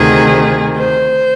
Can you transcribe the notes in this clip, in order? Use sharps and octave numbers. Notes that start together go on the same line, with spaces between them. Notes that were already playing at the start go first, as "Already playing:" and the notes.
Already playing: D2 C3 D#3 G#4
C5